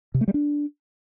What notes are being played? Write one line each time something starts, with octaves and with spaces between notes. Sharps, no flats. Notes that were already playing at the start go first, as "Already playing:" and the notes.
C3
A3
G3
D4